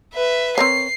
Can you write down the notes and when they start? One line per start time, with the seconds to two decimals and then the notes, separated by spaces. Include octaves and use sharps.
0.14 B4 E5
0.58 C4 A#4 C#5 C7